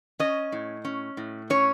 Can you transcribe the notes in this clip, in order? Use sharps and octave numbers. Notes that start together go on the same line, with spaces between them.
C#4 D#5
A2
C#4
A2
C#4 C#5